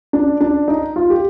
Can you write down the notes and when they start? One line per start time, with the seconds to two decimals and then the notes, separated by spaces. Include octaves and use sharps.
0.13 D4
0.41 D4
0.68 D#4
0.96 F4
1.10 G4